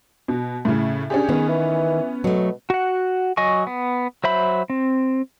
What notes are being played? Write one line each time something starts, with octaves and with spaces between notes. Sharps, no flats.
B2
A2 C#3
C#4 D4 G4 G#4
D#3 B3 C#4
E3
B2 F#3 A3
F#4 F#5
F#3 D#5 G#5 C#6
B3
F#3 C5 E5 B5
C4